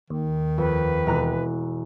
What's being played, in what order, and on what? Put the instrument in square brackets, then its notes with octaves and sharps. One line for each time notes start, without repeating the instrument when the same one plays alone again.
[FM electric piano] D#2 [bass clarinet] D#3
[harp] F2 [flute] B4
[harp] E1 A#5 F#6